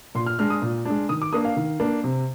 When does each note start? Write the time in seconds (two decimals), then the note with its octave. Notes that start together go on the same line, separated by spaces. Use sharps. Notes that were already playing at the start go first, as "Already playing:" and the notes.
0.15 A#2 C6
0.26 F6
0.39 G#3 D4 F6
0.50 D#6
0.62 A#2
0.85 G#3 D4
1.09 D#3 D#6
1.22 D6
1.33 A#3 D4 D#6
1.45 F5
1.57 D#3
1.80 A#3 D4
2.04 C3